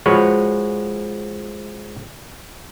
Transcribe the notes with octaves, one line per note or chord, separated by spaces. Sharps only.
F3 G#3 F#4 B4 C#5